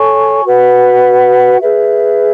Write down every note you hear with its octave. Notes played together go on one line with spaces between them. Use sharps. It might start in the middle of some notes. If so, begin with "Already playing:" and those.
Already playing: A4 C#5 G#5 C#6
F#4 B4 F#5
G#4 B4 E5